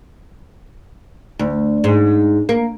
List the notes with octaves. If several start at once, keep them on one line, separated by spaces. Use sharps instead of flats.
D2
G#2
A#3